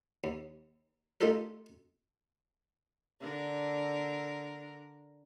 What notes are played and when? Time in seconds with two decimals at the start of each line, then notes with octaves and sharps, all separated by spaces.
0.24 D#2
1.21 A3 D#4 F4 G4 A4 A#4
3.20 D3 D4 A#4